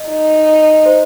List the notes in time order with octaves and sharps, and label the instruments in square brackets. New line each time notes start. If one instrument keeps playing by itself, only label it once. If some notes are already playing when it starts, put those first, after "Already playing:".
Already playing: [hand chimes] D#5
[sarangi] D#4
[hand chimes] C5